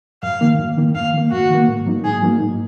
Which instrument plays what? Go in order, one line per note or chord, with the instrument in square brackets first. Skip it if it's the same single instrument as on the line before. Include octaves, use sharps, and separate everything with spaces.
[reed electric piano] F#2 [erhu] F5
[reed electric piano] D#3 A#3
F#2
D#3 A#3
[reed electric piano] F#2 [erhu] F5
[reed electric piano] D#3 A#3
[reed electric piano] F#2 [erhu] F#4
[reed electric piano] D#3 A#3
G#2
F#3 A#3 D#4
[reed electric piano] G#2 [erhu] G#4
[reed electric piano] F#3 A#3 D#4
G#2